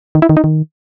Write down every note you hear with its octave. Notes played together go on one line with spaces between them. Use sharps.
D#3
E4
D#3
D#4
D#3